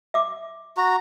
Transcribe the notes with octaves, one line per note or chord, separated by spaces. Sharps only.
E5 D6
F#4 A#5